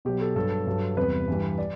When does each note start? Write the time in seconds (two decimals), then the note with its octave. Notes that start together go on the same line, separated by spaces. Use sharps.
0.05 B2 F#3 G4
0.21 A4
0.35 G2 F#3 A4
0.67 G2 F#3
0.97 E2 C3 G3 B4
1.28 G2 E3 G3
1.58 D5